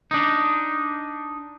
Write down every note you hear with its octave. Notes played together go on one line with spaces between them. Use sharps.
D4 D#4